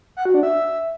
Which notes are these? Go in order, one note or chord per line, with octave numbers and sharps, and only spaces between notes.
F#5
F#4
D4
E5